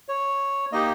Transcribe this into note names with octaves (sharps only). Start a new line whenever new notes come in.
C#5
A#3 D#4 G4 D#5